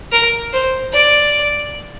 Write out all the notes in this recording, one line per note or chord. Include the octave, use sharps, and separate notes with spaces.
A#4
C5
D5